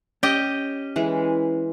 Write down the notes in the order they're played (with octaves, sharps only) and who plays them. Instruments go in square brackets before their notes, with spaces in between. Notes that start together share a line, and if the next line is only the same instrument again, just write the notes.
[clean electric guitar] C#4 [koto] G4 D#5
[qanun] E3 G#3